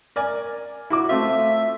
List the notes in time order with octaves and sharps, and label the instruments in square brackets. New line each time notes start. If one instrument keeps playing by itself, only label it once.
[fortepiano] A#4 D5 G#5
E4 F#4 D6
[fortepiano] A3 C4 F4 [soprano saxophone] E5